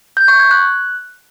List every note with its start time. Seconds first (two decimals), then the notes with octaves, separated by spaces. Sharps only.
0.17 G6
0.28 C#6
0.40 G#6
0.51 F#6